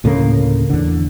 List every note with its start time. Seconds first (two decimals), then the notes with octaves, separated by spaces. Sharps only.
0.04 D2 A2 C#3 A#3
0.70 E2 D3